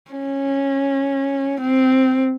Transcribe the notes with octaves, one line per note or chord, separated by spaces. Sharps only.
C#4
C4